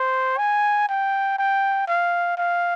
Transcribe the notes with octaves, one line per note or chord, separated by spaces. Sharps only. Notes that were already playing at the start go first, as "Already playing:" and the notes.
Already playing: C5
G#5
G5
G5
F5
F5